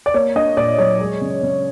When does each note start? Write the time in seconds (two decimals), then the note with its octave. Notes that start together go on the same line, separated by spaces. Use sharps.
0.06 D5
0.14 A#3 C#5
0.36 D4 D#5
0.57 A#2 D5
0.78 F#3 C#5
1.00 G#3
1.21 C#3
1.43 C#3